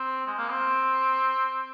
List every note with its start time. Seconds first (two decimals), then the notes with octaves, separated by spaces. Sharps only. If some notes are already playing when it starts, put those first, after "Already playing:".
Already playing: C4
0.27 G#3
0.38 A#3
0.49 C4